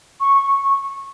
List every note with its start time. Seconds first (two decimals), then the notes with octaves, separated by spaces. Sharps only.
0.20 C#6